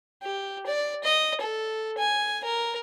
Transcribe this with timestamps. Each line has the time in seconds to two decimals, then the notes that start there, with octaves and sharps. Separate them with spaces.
0.22 G4
0.66 D5
1.04 D#5
1.40 A4
1.98 G#5
2.44 A#4